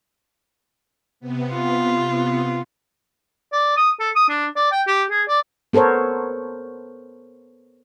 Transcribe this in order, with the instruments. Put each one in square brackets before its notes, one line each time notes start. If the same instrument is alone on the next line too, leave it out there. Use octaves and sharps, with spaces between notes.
[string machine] C3 B3
[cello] F4
[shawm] D5
D#6
A4
D#6
D4
D5
G5
G4
G#4
D5
[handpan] B3 A4 A#4 C5 C#5